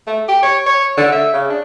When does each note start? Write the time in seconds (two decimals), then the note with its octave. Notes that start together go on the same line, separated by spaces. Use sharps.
0.07 A3
0.28 G4
0.43 C#5
0.66 C#5
0.97 D3
1.12 E5
1.34 C#3
1.50 D4